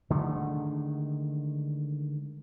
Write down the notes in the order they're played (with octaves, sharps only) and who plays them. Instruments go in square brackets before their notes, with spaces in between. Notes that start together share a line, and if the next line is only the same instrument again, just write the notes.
[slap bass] D3 D#3 G#3 A3